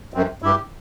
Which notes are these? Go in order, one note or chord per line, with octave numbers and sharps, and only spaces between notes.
F#2 C4
G2 E4 G4